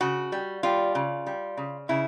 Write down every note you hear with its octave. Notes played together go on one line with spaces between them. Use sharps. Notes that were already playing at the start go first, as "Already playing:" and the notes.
C#3 F#4
G3
G3 F4
C#3
G3
C#3
C#3 E4